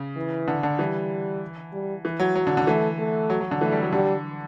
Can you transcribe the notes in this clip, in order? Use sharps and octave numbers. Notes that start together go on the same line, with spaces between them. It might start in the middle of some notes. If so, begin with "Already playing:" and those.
Already playing: C#3
E3
D3
D3
E3 G3
G3
E3
F#3
F#3
D3
D3
E3 A3
A3
F#3
F#3
D3
E3 A3
G3
F#3
D3 G3